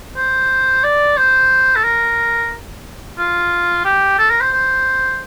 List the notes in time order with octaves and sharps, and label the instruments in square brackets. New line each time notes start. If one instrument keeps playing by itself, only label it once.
[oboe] C5
D5
C5
A4
A#4
F4
G4
A4
A#4
C5
C5